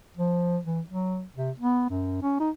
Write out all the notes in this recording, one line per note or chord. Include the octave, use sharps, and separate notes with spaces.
F3
E3
F#3
C3
B3
F#2
C#4
D#4